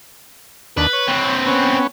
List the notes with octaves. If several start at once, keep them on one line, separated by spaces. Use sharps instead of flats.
D#2 D4 B4
C#5
C4 B4
B3 C#4